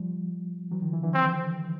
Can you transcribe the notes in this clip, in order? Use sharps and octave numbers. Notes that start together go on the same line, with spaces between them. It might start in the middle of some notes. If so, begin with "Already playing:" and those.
Already playing: F3 G3
E3 F#3
D#3 F3
D3 E3
D3 E3
C4